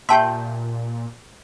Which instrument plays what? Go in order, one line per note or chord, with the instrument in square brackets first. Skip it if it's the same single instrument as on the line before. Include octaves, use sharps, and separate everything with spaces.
[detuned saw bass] A#2 [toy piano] G4 A5 C6 [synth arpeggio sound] E5 G5 G6